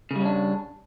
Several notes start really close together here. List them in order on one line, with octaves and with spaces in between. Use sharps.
C#3 G3 C#4 D4